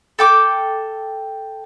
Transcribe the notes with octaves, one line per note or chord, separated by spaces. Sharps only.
A4 G5 D6